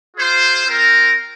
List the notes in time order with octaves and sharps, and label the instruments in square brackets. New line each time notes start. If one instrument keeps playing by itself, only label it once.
[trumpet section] F4 G#4 C5
C4 F4 A#4